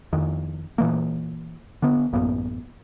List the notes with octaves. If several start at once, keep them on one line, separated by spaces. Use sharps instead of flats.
F2 D#3
A#2 E3 A#3
D3 B3
A1 F#2 A#3 B3